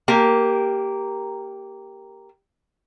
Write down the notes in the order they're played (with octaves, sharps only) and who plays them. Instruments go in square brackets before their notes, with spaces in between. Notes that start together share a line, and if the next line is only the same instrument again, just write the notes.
[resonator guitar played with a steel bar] A#3 G4 A#4